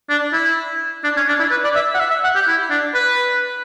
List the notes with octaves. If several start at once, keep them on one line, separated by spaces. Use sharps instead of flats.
D4
E4
D4
C#4
D4
E4
B4
D5
E5
F#5
E5
E5
F#5
G4
E4
D4
B4